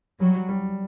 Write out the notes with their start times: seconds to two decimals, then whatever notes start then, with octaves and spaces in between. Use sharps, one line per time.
0.20 F#3 G3
0.49 G3